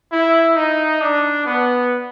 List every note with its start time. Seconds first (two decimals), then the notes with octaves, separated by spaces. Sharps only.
0.12 E4
0.56 D#4
1.01 D4
1.46 B3